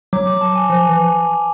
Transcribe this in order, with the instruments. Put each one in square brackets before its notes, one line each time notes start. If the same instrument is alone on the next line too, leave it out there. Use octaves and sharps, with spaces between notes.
[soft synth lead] F#3 [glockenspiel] D6
[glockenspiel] D6
A5
G#5
A5
[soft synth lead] F3 [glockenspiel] G#5
[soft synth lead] E3